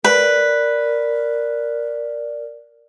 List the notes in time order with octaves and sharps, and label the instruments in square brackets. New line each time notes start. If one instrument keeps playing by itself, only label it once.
[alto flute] A#4 [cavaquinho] B4 [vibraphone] D5